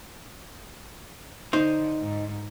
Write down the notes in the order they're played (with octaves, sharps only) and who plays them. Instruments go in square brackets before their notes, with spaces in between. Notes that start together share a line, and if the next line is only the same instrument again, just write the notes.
[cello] D3 [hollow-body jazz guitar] D#4 C5
[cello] G#2